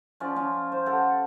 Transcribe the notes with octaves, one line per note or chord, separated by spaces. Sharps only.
F3 C#4 D5
F3 C#4
C5
G4 A4 F#5